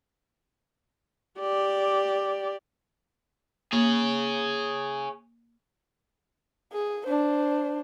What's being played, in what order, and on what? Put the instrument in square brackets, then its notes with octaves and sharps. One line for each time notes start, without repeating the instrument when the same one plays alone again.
[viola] G4 D5
[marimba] A#3 [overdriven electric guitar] G#4 C#5
[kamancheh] G#4
D4 C5